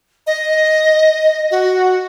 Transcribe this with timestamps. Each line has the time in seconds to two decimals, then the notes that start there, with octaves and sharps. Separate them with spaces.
0.27 D#5
1.51 F#4